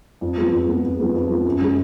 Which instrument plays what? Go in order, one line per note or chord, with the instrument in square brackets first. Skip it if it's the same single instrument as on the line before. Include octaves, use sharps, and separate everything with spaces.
[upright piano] F2
F3 G#3 B3
F2
F3 G#3 B3
F2
F3 G#3 B3
F2
F3 G#3 B3
F#2
C#3 G#3